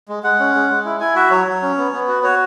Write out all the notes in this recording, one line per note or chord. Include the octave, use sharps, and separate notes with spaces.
G#3
G#3 F#5
C#4
G#3
G#3
E4
E4 G#5
F#4 E5
F#3 C#5
F#3
C#4
B3
B3
F#4
F#4 C#5